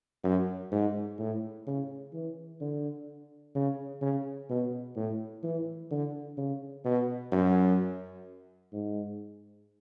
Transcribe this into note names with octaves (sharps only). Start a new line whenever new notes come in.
F#2
G#2
A2
C#3
E3
D3
C#3
C#3
B2
A2
E3
D3
C#3
B2
F#2
G#2